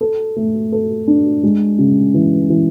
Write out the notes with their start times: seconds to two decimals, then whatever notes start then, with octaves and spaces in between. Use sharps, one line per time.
0.01 A4
0.36 A3
0.72 A4
1.07 D4
1.43 G#3
1.79 C#3
2.14 E3
2.50 E3